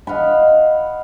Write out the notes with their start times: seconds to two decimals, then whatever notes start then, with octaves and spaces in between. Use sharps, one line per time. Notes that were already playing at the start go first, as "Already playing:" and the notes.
0.07 D#5 F5 F#5 B5